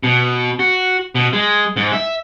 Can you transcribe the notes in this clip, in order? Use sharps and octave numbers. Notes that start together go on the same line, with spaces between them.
B2
F#4
B2
G#3
G#2
E5